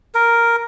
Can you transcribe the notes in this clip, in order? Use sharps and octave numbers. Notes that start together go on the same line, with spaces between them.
A#4